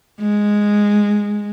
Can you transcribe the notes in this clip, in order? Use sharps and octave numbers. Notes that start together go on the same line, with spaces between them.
G#3